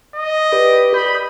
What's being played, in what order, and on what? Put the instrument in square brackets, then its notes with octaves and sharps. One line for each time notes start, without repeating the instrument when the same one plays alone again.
[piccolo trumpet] D#5
[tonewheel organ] G4 B4 D5
[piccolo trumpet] B5 [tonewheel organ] D#6 G6